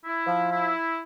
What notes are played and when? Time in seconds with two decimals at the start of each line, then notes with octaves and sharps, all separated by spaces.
0.05 E4
0.27 F3
0.50 E4